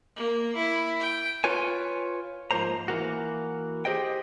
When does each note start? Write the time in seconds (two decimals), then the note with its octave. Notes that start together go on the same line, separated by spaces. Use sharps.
0.16 A#3
0.55 E4
1.00 G5
1.44 F4 B4 C#5 G#5
2.51 G#2 F3 F#3 A#3 C5 A#5
2.88 E3 A#3 F#4
3.85 G4 G#4 C5 D#5 G5